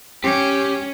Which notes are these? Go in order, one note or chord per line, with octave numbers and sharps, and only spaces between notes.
C#4 G4